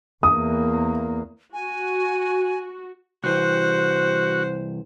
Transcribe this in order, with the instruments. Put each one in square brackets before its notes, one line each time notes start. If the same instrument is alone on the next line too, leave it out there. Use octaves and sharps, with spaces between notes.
[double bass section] E2 A#3 [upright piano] D#6
[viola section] F#4 [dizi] G#5
[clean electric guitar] C2 E3 [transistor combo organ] F#4 [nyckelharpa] C5